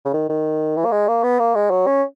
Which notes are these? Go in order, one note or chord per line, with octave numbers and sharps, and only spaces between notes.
C#3
D#3
D#3
E3
A#3
G#3
A#3
B3
A#3
G#3
F#3
C#4